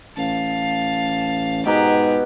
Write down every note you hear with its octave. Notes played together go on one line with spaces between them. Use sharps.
A1 F5 A5
G#2 B2 G4 G#4 A#5